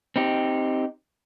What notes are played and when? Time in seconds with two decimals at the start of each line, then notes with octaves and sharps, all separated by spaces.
0.16 C4 D#4 G4